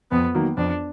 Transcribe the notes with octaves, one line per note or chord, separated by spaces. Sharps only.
F2 B3
D#3 F#3 A#3
F2 D4